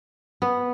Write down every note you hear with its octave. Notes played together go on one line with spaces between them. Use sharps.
B3